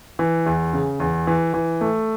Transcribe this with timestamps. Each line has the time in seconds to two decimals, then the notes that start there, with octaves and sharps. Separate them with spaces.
0.19 E3
0.46 E2
0.73 C#3
1.00 E2
1.27 E3
1.54 E3
1.81 A3